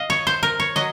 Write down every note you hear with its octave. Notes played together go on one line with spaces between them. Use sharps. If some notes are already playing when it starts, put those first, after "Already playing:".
Already playing: D#5 F5
C#5
C5
A#4
C#5
F#3 D#5